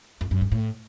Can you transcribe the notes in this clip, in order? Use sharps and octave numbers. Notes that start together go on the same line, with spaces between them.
F2
F#2
G2
A2